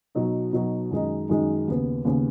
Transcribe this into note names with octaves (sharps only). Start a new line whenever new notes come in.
B2 F#3 D#4
B2 F#3 D#4
F#2 D#3 G#3 D#4
F#2 D#3 G#3 D#4
D#2 C#3 B3
D#2 C#3 B3